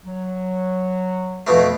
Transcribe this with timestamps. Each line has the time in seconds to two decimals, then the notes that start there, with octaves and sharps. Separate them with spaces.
0.05 F#3
1.47 F2 B2 A3